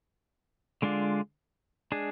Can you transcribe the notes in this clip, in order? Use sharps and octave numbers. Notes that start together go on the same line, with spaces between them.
D3 G#3 D4 F4
G#3 D4 G#4